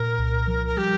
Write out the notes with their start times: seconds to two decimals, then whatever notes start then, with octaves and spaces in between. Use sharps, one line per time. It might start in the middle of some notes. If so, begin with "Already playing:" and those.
Already playing: A#2 A#4
0.19 C2
0.48 F3
0.66 A#4
0.77 G3 G4